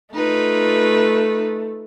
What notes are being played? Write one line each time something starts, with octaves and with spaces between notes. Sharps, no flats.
A3 D#4 F4 B4